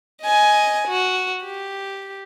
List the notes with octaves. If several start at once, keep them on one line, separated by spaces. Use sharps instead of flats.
D#5 G#5
F#4
G4